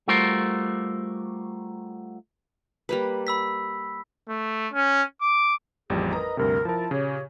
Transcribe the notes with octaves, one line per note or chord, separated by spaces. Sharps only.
G3 A3 F4 F#4 A#4 C5
G3 A#3 B4
B5 E6 B6
A3
C#4
D6
A1 F2 G3 E4 G#4
A#4 B4 D#5 A#5
D2 G2 C3 A#4
F3 E4 F4 A#4 A5
A#2 C#3 G4 C#5